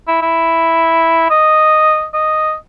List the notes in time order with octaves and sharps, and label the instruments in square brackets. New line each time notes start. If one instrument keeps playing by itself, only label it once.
[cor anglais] E4
E4
D#5
D#5